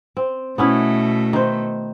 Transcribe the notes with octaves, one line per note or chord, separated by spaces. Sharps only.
C4
B2 A3 B3 C#4 E4
D#3 B4 C5